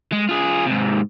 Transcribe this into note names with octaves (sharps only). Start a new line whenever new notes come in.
G#3
F4 G#4
G#2 C3